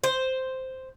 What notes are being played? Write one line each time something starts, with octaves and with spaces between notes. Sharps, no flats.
C5